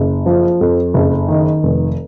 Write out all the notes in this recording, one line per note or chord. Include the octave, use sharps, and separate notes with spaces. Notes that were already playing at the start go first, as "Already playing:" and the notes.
Already playing: F#1
F3
F2
F#1
D#3
F1